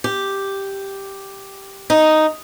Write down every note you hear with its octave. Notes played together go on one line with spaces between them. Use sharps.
G4
D#4